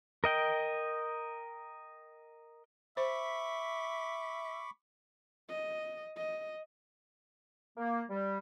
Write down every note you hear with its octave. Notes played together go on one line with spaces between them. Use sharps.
A#4 D#5 G5
C5 E5 B5 C#6 D6
D#5
D#5
A#3
G3